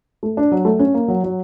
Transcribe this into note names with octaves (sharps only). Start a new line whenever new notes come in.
A3
D4
F#3
A3
C#4
A#3
F#3
F#3